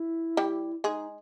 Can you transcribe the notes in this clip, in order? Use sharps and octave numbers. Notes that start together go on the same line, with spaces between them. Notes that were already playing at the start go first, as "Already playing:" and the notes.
Already playing: E4
G3 G4
G#3 D#4 G#4